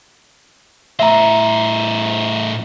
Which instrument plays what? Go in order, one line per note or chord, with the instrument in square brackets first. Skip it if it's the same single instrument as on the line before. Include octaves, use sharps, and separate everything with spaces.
[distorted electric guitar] A2 C5 [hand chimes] E5 A#5